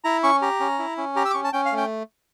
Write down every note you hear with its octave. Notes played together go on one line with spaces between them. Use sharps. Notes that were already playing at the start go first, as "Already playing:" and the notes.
E4 A#5
C#4 C#6
G4 A#5
C#4
E4
C#4
G4 A#5
E6
D6
C#4 C#6
A5
C#4 G5
F5
A3
G5